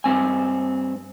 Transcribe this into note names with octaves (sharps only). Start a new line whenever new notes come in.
G2 C4 G#5